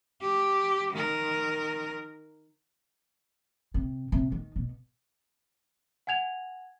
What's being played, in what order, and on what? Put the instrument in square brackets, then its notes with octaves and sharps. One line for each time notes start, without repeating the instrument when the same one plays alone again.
[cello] G4
D#3 A#4
[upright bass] C3
C3
D#3
B2
[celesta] F#5 G#5 G#6 F7